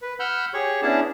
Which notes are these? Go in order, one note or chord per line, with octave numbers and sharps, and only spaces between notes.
B4
F#5 B5 E6 F6 G6
G4 G#4 C#5 C#6
B3 C#4 D4 E4 G#4 A5